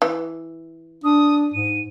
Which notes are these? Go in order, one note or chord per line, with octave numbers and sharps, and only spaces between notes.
E3
D4 D#6
G#2 D#7